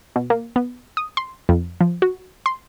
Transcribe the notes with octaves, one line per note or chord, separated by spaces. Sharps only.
B2
A#3
B3
D#6
C6
F2
F3
F#4
C6